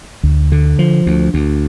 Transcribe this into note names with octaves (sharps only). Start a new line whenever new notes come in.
D2
D3
F3
D2
D2